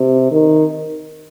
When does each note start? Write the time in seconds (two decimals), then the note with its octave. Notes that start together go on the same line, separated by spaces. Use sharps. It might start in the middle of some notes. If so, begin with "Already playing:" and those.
Already playing: C3
0.31 D#3